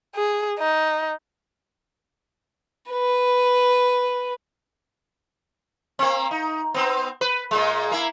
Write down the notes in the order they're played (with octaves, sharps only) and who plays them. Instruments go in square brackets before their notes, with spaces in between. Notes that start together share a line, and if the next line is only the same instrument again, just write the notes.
[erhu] G#4
D#4
[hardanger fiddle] B4
[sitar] A#3 C4
D#4
B3 C4
B4
A#2 G#3
A#3 E4